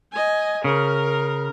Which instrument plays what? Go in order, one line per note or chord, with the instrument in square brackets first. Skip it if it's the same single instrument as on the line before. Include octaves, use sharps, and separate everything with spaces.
[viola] D#5 G#5
[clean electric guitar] C#3 [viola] A#4